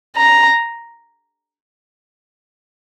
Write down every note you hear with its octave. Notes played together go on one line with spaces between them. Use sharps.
A#5